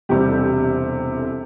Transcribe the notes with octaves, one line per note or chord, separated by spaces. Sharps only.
E1 E2 C3 G3 G4
A4
G4
A4